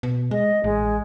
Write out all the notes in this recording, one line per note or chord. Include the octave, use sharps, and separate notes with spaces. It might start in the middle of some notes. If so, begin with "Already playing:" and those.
B2
G#3 D#5
A1 G#3